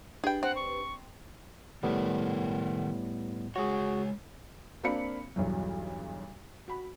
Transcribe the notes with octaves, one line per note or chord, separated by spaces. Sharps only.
D4 G4 G#4 B4 G5
C4 F#5
C#6
A2 D#3 G3 B3 A4 A#4
G#3 F#4 G#4 C#5
A#3 C4 D4 F5 B5 C#7
B1 E2 G2 F#3
F#4 B5